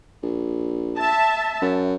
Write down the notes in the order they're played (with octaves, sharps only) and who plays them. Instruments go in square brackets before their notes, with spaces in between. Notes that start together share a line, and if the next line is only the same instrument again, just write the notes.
[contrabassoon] A#1
[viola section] E5 A5
[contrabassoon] F#2